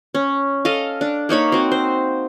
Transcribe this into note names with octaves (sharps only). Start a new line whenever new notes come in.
C#4
A4 D#5 F5
D4
A#3 D#4 C#5 B5
C4 F#4
C5